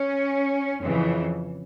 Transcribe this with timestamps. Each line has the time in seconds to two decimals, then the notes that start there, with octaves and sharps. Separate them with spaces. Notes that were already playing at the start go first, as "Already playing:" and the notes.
Already playing: C#4
0.83 F2 C#3 E3